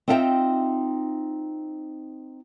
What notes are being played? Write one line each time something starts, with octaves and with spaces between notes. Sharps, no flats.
C4 D#4 F4 E5 F5 G5